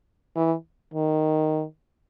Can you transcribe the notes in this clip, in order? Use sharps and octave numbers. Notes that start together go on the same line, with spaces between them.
E3
D#3